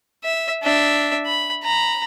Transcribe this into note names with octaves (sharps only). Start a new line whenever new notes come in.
E5
D4 E5
B5
A#5 B5